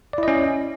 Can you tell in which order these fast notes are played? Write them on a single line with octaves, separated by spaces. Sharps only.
D5 E4 D#5 C#4